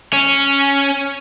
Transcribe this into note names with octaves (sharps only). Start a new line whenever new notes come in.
C#4